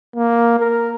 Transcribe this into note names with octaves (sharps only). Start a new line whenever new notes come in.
A#3
A#4